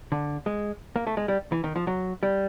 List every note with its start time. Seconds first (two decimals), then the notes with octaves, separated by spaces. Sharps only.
0.12 D3
0.46 G#3
0.96 A#3
1.07 A3
1.17 G#3
1.28 G3
1.52 E3
1.64 D#3
1.76 F3
1.87 F#3
2.23 G3